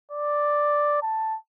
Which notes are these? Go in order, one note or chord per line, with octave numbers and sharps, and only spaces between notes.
D5
A5